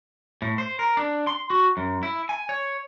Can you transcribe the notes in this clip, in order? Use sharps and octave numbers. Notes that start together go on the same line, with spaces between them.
A2
C5
A#4
D4
C6
F#4
F#2
E4
G#5
C#5